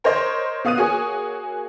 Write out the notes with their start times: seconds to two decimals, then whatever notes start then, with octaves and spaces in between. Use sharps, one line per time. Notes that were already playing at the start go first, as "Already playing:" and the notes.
0.04 A#4 C5 C#5 D#5
0.65 B3 F5 D#6 F#6 D#7
0.77 A#3 F#4 G#4 C#5 G#5